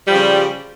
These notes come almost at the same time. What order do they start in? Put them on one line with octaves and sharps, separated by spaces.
G3 F3 C#3